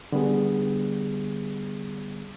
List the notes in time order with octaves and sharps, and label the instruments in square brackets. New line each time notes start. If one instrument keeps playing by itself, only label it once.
[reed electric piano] D3 G3 B3 G#4